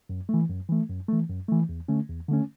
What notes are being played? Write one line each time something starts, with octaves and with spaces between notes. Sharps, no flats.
F#2
E3 A3
F#2
E3 A3
F#2
E3 A3
F#2
E3 A3
E2
D3 A3 C#4
E2
D3 A3 C#4